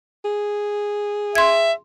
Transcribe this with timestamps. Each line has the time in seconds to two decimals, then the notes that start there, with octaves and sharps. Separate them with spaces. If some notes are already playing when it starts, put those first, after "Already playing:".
0.25 G#4
1.35 E5 C6 G#6